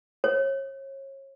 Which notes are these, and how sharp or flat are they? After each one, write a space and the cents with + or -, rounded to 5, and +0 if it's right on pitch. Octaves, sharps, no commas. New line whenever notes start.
C#5 -35